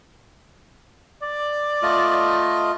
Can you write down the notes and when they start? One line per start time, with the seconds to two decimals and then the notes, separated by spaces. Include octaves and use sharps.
1.23 D5
1.82 A3 F4 D#5